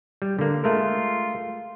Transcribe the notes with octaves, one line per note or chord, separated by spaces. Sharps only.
G3
D3 A#3
G#3 A3 F4 A#4